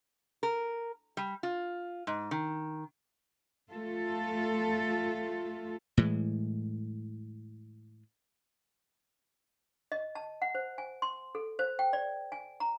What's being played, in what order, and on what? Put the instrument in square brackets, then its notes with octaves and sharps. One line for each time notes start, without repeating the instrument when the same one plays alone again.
[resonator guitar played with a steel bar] A#4
G3
F4
G#2
D#3
[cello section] A3 F4 A4
[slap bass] A2 E3 G#3
[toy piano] D#5
A5
F#5
C5
G#5
C6
A4
C5
G5
D5
G#5
A#5